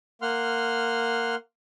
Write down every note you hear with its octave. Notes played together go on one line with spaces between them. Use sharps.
A#3 F#5 C6 F6